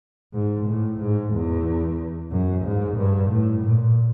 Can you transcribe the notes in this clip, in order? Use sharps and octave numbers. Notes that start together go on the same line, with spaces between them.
G#2
A2
G#2
E2
F#2
G#2
G2
A2
A#2